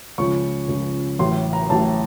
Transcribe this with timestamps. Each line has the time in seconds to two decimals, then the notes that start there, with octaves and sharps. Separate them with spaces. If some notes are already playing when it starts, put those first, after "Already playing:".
0.18 C#2 C#3 F3 C#6
0.68 C#2 C#3 F3
1.19 A1 A2 F#3 C6
1.53 A#5
1.70 A1 A2 F#3 A5